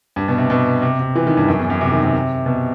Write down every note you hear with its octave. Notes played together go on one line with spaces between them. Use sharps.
G2
B2
C3
B2
C3
C3
E3
D#3
G2
F#2
E2
F#2
C3
D#3
C3
B2